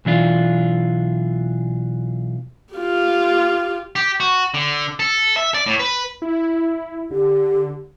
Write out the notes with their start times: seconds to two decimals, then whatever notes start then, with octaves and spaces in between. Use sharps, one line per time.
0.05 B1 E3 D4 F4
2.74 F4 G4
3.96 G4
4.20 F#4
4.54 D3
5.00 A4
5.37 E5
5.54 D5
5.66 A2
5.79 B4
6.22 E4
7.11 D3 G4